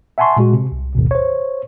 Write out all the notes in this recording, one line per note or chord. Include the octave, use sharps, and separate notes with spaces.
E5 F#5 G#5 A5 C6 C#6
A#2 G#3 F#4
C3
C2
G#1 D2 B2
C5 C#5